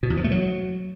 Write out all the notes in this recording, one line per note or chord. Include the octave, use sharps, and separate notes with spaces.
B2
E2
F3
A3
F#3